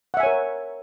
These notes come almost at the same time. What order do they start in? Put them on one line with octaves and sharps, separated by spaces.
F#5 E5 G#5 C#5 A#4